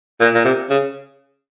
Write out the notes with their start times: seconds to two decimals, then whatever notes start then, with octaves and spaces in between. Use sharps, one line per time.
0.21 A#2
0.35 A#2
0.45 C3
0.70 C#3